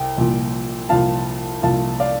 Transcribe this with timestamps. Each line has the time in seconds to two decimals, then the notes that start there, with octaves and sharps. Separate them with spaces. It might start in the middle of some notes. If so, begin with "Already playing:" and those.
Already playing: C2 G5
0.17 C2 A#2 F3
0.89 C2 A#2 F3 F5 A5
1.62 C2 A#2 F3 F5 A5
2.00 D5 F5